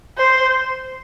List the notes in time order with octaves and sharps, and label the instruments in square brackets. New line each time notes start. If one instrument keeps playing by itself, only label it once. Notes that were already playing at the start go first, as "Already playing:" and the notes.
[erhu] C5